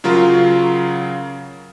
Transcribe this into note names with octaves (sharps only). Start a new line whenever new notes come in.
C#3 F#3 F4 A#4